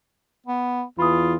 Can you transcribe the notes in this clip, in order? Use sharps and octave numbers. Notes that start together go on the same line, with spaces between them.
B3
E2 E3 F4 B5 D#6